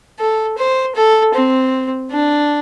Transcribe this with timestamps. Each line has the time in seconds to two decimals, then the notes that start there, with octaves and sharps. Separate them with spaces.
0.19 A4
0.58 C5
0.96 A4
1.35 C4
2.11 D4